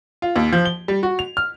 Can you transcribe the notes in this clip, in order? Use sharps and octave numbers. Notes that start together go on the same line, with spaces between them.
F4
D#2
F3
G7
G3
F#4
F7
F6